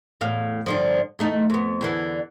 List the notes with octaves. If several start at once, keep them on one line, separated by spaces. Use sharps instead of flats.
E2 A2 F5
G2 D3 F3
E2 A3 D#4
F2 B3
E2 D3 E3